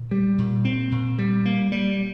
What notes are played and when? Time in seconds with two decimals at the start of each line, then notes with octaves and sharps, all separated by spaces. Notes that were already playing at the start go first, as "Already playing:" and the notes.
Already playing: A#2
0.11 G3
0.38 A#2
0.65 C4
0.92 A#2
1.18 G3
1.45 A#3
1.72 G3